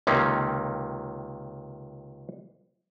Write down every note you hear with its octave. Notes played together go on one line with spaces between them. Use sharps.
C#2 C3 D#3 A#3 C#4